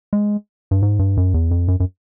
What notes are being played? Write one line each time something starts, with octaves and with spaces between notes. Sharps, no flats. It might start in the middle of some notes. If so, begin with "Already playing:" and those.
G#3
G2
G#2
G2
F#2
E2
F2
F#2
F#2